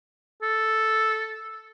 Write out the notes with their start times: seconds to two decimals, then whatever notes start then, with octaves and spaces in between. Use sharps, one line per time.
0.42 A4